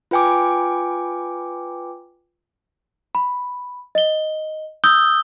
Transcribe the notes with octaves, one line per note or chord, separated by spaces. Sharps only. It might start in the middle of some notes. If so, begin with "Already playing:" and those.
F4 B4 G5 G#5 D6
B5
D#5 G7
D#6 E6 G6 G7